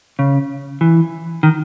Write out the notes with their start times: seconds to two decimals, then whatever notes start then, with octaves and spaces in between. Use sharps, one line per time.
0.19 C#3
0.81 E3
1.43 D#3